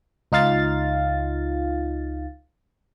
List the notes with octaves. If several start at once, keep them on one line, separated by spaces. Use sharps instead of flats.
C#2 D#4 F4 F5 A6